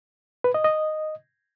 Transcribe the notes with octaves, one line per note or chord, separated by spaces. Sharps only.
B4
D#5
D#5